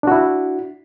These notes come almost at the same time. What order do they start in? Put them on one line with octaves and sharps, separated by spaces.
D4 F#4 E4